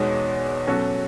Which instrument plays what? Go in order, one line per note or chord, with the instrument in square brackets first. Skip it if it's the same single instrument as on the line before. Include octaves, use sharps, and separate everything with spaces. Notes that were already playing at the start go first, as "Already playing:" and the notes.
Already playing: [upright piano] E2 B2 G#3 D#4 F#4 [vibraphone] C#5
[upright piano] B2 F#3 C#4 F#4 A4